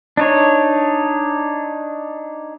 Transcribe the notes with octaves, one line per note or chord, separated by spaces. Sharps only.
D4 D#4 C#5